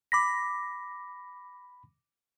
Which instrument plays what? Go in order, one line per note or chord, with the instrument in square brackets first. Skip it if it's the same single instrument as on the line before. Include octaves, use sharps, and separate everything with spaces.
[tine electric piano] B5 B6 [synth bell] D6 A#6